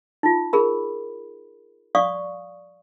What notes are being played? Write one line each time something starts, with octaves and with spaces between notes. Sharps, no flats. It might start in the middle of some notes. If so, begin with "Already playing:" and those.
D#4 F4
G#4 A#4 B5
D5 F5 C#6 D#6